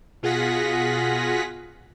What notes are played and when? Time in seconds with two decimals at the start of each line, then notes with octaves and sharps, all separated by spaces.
0.23 B2 F4 G#4 F#5 A#6 B6